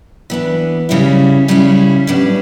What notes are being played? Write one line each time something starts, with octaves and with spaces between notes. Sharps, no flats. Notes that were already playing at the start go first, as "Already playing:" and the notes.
E3 B3 D4
C#3 G3 C#4 E4
C#3 G3 C#4 E4
A2 G3 B3 D4